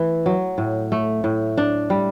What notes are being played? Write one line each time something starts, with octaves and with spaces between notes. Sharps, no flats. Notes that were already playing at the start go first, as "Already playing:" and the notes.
Already playing: E3 A3 E4
F#3
A2
A3
A2
D4
G3